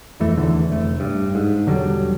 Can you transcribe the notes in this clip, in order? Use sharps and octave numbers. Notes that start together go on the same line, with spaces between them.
D#1 F2 E3 A3
D#1 E2 D3 E3
F1 A3
G2
G#2
E1 D3 F#3 G3